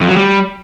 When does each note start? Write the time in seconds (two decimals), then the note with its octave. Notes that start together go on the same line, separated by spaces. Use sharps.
0.01 F2
0.09 F#3
0.17 G3